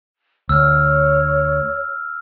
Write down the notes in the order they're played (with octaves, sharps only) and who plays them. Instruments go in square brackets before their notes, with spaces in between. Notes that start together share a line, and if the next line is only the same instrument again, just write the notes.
[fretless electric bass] D2 [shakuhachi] C#5 [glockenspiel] E6 F6